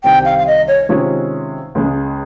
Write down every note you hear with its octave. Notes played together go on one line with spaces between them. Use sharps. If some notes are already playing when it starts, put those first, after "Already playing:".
C2 C3 D#3 G3 G5
F5
F5
D#5
C#5
C3 D#3 G#3 C#4 F4
C#2 C#3 G#3